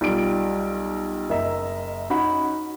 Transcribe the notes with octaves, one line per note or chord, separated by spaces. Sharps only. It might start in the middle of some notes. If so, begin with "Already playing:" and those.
B1 G3 F4 D7
F#1 A#4 D#5 E5 A#5
C#4 D#4 F#4 B5